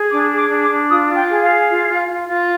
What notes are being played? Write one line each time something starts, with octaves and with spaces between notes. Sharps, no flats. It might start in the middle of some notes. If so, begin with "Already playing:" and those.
Already playing: G#4
D4 D6
G#4
D6
D4
D6
D4
F4 D#6
F4
G5
G#4
F5
G#4
F4
F4
F4
F4